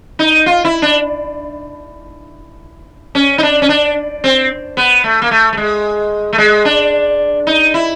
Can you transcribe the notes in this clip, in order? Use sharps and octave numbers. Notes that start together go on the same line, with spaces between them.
D#4
F4
E4
D4
C#4
D#4
D4
C#4
D4
C4
B3
A3
A#3
A3
A3
G#3
A3
G#3
D4
D#4
E4